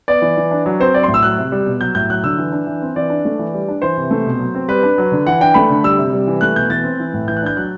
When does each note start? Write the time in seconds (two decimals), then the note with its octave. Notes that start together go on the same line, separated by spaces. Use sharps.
0.08 B3 D5
0.22 E3
0.37 E3
0.51 D4
0.66 F#3
0.80 C4 C5
0.94 F#3 D5
1.03 C6
1.08 A2
1.14 E6
1.23 F#3 F#6
1.38 C3
1.52 G3
1.66 B2
1.80 F#3 G6
1.95 A2 G6
2.10 F#3 F#6
2.24 D3 E6
2.38 E3
2.52 D4
2.66 E3
2.82 C4
2.96 E3 D5
3.10 D4
3.25 A3
3.39 E3
3.54 G3
3.68 D4
3.82 E3 C5
3.97 C3
4.11 A3
4.26 B2
4.39 F#3
4.55 C4
4.68 G3 B4
4.83 D4
4.98 F#3
5.12 D3
5.27 E3 F#5
5.40 D4 G5
5.54 A3 B5
5.70 D3
5.84 G3 E6
5.98 C3
6.13 G3
6.27 E3
6.41 A3 F#6
6.56 B2 G6
6.70 E3 A6
6.84 C4
6.99 E3
7.14 A2
7.28 E3 G6
7.37 F#6
7.42 D4 G6
7.57 F#3 F#6